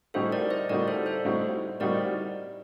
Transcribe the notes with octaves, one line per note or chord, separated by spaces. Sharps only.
A2 G3 C4 D#4 F#4 A4 C5
A#4 D5
C5 D#5
A2 G3 C4 D#4 F#4 A#4 D5
A4 C5
A4 C5
A2 G3 C4 D#4 F#4
A2 G3 C4 D#4 F#4 A#4 D5